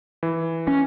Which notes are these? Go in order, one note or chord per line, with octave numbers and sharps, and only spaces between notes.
E3
C#4